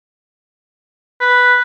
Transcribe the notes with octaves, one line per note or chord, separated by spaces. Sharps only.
B4